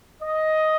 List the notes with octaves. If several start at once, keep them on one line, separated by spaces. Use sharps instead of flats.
D#5